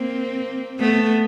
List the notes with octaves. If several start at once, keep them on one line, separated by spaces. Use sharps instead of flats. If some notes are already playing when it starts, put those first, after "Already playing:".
Already playing: A#3 C4
A3 B3